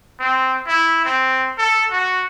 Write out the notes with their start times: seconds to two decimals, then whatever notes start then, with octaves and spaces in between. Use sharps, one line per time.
0.20 C4
0.67 E4
1.05 C4
1.58 A4
1.91 F#4